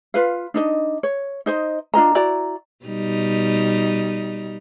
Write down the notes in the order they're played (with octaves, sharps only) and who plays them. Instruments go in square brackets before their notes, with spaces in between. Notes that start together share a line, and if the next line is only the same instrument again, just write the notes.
[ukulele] F4 B4 F5
D4 D#4 D#5
C#5
D#4 C5 D#5
D4 F4 D#5 A#5
E4 F#4 D5 A#5
[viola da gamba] B2 G3 D#4